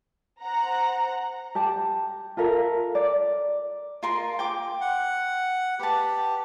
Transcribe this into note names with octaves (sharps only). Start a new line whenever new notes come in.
C5 F#5 A#5
G4 G5 A5
F4 A4 A#4 E5
D5
F4 A#4 C6
G5 D6
F#5
G4 B4 A5